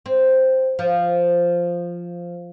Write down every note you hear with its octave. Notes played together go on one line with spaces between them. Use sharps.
C4
F3